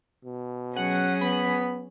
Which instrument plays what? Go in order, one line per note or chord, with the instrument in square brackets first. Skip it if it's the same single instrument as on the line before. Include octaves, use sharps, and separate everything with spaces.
[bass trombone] B2
[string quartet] F#3 C#4 G#4 [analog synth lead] F#5
[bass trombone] B3 [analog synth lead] B5